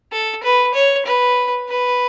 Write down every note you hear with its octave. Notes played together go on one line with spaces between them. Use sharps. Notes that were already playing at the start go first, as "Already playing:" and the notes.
A4
B4
C#5
B4
B4